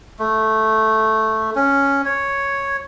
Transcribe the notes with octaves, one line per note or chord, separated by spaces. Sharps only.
A3
C#4
C#5